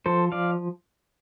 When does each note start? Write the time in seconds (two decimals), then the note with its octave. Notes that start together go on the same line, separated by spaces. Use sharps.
0.06 F3 A4 C5
0.32 F3 D5 F5